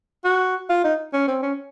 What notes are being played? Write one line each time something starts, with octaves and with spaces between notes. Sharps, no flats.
F#4
F4
D#4
C#4
C4
C#4